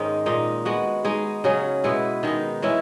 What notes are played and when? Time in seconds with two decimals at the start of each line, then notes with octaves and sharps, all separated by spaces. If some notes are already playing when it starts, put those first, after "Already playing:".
Already playing: G#2 D#3 G#3 C#4 D#4
0.26 A#2 G#3 D#4
0.65 G#3 B3 F#4
1.04 G#3 D#4 G#4
1.44 C#3 F#3 C#4 G#4
1.84 B2 G#3 B3 E4
2.23 D#3 G#3 D#4
2.62 E3 G#3 C#4 E4